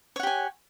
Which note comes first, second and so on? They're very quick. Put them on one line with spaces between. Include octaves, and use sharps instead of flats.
C#5 F#5 G4 G#5